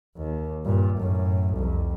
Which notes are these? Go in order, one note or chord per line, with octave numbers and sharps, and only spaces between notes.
D#2
G2 A#2
F#2 A2
C2 F2